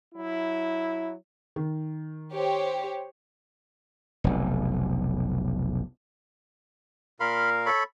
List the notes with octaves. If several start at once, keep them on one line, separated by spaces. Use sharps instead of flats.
F#3 E4
D#3
G4 C5 C#5
F1 B1
A#2 A#4 F5 B5 C6
A4 C#5 B5